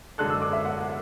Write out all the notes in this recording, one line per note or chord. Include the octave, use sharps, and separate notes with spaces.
F#2 D3 G#3 D4 A4 F#6
E6
D6
E5
F#5
F#5